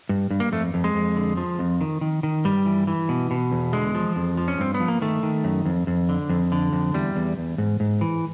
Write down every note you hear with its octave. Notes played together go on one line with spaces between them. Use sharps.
G2
G2
A#3
F2 A3
F2
G#3
F2
D3
F3
F2
D#3
D#3
D#3
G2 G3
E3
E3
B2
B2
E2
D3 G#3
F3
F2
F3
C#4
G2 C4
B3
F3
A#3
D#3 A3
D#3
F#2
F2
F2
D3
F2
D3
F2
E2 G3
E2
E2
G#2
G#2
E3